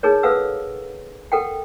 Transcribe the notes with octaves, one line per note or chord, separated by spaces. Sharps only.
D#4 G#4 A#4 C#5
A4 B4 F5 F#5 E6
A4 A#4 F#5 G5